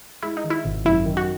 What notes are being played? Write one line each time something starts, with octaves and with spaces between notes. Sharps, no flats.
G#3 E4
D#4
D#3
E4
G#1
F#2 E4
D#3
F#4